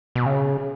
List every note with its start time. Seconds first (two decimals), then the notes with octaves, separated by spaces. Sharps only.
0.15 B2
0.26 C#3